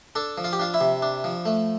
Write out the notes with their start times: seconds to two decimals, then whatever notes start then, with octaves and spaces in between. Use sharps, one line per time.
0.15 D4 A4
0.38 F3
0.44 F4
0.53 G4
0.59 D4 F4
0.74 E4
0.81 C3
1.02 D4
1.24 F3
1.45 A3